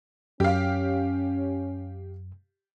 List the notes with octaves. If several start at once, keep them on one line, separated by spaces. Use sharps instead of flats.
F#2 C#4 G4 F5